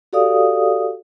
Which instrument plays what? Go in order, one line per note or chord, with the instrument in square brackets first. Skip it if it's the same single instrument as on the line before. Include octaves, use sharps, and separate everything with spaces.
[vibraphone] F#4 G4 A4 D5 F5 D#6